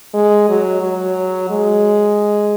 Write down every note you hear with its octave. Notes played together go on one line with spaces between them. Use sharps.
G#3
F#3
F#3
G#3